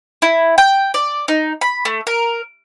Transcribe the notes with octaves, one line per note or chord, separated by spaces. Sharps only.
E4
G5
D5
D#4
B5
A3
A#4